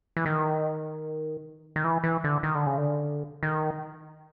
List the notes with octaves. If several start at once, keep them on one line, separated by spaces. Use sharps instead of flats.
E3
D#3
D#3
E3
E3
D3
D#3
D3
C#3
D3
D#3